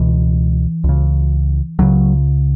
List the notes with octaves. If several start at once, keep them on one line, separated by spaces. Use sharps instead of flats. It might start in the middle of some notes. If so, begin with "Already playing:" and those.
Already playing: C#2 B2 E3
C#2
C#3
C#2 C#3 F#3